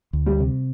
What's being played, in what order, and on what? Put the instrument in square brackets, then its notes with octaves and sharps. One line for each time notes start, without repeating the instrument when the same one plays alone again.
[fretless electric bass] D2
[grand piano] G3
[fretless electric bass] C3